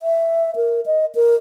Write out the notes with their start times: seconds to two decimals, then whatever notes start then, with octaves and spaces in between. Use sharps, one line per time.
0.01 E5
0.56 A#4
0.86 D#5
1.15 A#4